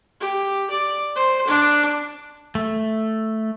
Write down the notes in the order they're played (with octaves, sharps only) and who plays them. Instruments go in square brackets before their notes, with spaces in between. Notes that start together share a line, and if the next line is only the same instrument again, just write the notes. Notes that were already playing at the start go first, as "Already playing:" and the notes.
[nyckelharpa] G4
D5
C5
D4
[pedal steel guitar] A3